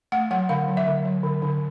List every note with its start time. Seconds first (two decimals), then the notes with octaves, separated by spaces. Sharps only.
0.12 A3 F#5
0.31 F#3 F#5
0.49 D3 F5
0.68 F#3
0.77 E5
0.87 D3
1.05 F#3
1.23 D3
1.42 D3